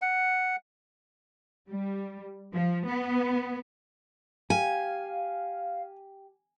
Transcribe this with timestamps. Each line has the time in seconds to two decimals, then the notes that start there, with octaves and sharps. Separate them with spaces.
0.02 F#5
1.69 G3
2.53 F3
2.87 B3
4.50 G4 F5 G#5